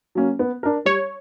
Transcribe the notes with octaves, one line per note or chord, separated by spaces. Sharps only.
F#3 A#3 C#4
B3
D4 A#4
G3 C#5